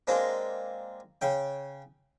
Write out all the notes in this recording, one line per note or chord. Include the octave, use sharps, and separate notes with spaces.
G#3 A#3 C4 D4
C#3 G5